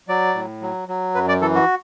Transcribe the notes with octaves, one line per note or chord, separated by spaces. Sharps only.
F#3 D5
A2
F#3
F#3
F#2 B4
D5
E3 A4
F#4